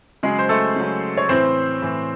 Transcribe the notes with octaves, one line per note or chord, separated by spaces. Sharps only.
C#3 F#3 G#3 G#4
C5
A3 A4
C#3 F#3
C#5
A2 E3 C4 C5
A2 E3